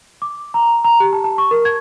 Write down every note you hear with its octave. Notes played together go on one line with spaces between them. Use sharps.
D6
A#5
A#5
G4
A5
A5
C#6
A#4
G#6